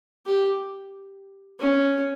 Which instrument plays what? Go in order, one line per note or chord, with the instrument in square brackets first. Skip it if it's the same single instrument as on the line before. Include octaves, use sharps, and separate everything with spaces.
[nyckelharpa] G4
C#4